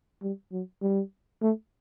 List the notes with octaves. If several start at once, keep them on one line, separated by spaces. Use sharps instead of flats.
G3
F#3
G3
A3